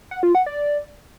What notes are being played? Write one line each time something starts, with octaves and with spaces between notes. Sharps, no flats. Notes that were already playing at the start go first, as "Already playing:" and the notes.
F#5
F4
F#5
D5